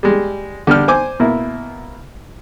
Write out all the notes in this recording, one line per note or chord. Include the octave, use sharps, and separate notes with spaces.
G3 G#3
D3 G3 G4 F6
C5 G#5 D6
B2 A#3 E4